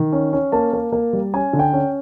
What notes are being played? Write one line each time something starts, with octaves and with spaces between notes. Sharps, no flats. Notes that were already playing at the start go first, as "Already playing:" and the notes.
Already playing: D#3
C#4
C#4
A#3 A5
A#3
A#3
G3
C#4 G#5
D3
G5
C#4